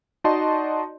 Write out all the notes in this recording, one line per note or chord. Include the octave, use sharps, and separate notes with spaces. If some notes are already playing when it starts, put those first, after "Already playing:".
D#4 F#4 D5 D#5 A5 C6